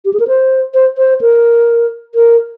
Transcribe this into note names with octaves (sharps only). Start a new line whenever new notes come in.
G4
G#4
A#4
C5
C5
C5
A#4
A#4